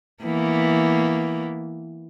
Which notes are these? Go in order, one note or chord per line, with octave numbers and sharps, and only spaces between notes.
E3 A#3 B3